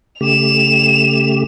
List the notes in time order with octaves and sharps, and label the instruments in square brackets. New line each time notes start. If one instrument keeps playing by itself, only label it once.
[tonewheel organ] C#3 A3 G4 [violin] E7 F7